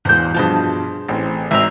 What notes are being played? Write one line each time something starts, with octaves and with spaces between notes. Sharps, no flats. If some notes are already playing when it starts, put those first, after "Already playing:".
E1 E2 C5 G6
G2 B2 F3 G#4 C5 A5
A1 C4
G#1 C4 E5 A5 A#5 E6